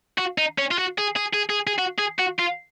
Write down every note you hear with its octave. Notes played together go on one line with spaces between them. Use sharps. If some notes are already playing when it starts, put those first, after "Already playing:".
F#4
D#4
C#4
F4
F#4
G#4
G#4
G#4
G#4
G#4
F#4
G#4
F#4
F4